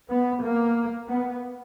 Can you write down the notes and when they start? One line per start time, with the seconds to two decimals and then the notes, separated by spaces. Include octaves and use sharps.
0.10 B3
0.43 A#3
1.08 B3